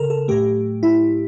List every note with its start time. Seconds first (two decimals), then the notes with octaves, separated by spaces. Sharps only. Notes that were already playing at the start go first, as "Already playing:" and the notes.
Already playing: C#3 A4 A#4
0.10 A4
0.28 A2 F#3 A3 G4
0.83 E4